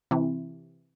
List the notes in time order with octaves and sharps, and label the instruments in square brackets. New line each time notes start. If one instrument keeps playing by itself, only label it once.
[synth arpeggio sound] C3 E3